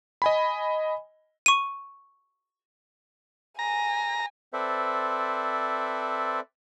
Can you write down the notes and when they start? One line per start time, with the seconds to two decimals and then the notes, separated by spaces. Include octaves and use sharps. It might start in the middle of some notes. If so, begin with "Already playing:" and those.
0.22 D#5 G#5 B5
1.46 C#6 D#7
3.59 G#5 A#5
4.53 C4 A4 B4 C5 D5 E5